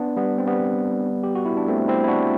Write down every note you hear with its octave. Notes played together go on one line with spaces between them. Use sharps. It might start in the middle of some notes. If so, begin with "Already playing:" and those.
Already playing: B3 D4
G3 B3
C4
G3 B3
G4
F#4
E4
D4
A3 C4
C4 E4
E4
D4 F#4